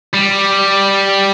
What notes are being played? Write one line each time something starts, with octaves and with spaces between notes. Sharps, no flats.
G3